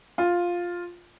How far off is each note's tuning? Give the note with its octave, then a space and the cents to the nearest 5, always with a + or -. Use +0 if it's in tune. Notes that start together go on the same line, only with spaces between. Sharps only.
F4 +5